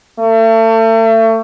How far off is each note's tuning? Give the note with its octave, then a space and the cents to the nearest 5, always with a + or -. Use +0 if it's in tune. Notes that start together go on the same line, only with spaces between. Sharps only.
A3 +35